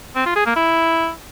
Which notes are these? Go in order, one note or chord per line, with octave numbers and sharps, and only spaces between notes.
C4
F4
G#4
A#3
E4